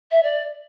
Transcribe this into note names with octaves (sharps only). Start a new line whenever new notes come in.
E5
D5